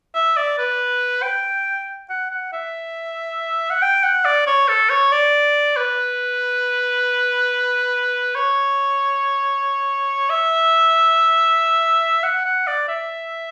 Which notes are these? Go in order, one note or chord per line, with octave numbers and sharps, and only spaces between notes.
E5
D5
B4
G5
F#5
F#5
E5
F#5
G5
F#5
D5
C#5
A4
C#5
D5
B4
C#5
E5
F#5
F#5
D5
E5